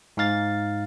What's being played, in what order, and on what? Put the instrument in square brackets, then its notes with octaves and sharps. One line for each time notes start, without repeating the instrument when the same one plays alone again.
[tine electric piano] G#2 D#4 F5 A6